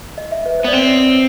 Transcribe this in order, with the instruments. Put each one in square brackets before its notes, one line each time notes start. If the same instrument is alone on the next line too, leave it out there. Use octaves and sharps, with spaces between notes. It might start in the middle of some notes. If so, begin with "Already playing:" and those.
[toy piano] D#5
E5
B4
C5
[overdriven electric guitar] B3 [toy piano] D5
[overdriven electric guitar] C4 [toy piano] C#5